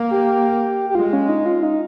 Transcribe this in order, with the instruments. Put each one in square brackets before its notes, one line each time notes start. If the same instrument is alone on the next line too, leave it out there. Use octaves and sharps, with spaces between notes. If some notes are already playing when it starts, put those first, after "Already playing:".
Already playing: [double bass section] A#3
[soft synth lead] G4
G4
[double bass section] G#3 [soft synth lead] F4
[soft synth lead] C#4
D#4
F4
D#4